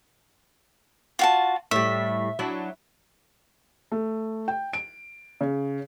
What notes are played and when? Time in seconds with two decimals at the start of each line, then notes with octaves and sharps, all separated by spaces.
1.19 F4 F#4 A5
1.71 A2 G3 E5
2.39 F#3 D4 E4
3.92 A3
4.48 G5
4.73 D7
5.41 C#3